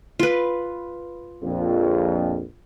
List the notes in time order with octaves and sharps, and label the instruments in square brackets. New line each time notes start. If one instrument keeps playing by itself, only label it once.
[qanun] F4 B4
[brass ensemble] A#1 F2